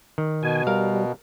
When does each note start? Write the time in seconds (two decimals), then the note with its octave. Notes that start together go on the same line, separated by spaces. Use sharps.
0.18 D#3
0.43 B2 G#5
0.67 G3 A#4 F5